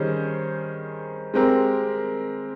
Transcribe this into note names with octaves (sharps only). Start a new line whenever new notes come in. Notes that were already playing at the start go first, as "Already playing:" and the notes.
Already playing: D#3 G3 C#4 G#4 C5
G#3 C4 G4 A#4